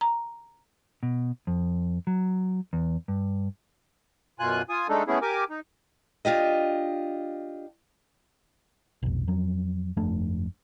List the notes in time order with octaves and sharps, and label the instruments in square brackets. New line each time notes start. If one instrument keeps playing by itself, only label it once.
[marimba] A#5
[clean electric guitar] B2
F2
F#3
E2
G2
[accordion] F#2 B2 F4 G#5 F#6
F4 G#5 D#6
G#3 A3 D4 D#4 A4
A3 B3 C#4 E4 G#4
G4 A#4 G#5 D6
D#4
[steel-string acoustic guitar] D4 F4 G4 D#5
[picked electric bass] F1 B1
F2 F#3
G1 F2 A3 D4